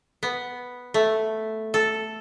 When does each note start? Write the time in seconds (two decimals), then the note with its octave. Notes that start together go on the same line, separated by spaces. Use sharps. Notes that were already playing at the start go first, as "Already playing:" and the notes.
0.23 B3
0.94 A3
1.74 A4